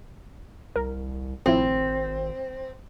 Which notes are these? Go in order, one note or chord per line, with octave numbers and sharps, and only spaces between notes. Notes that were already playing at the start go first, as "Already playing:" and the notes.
C2 A#4
G#1 A2 F3 C4 E4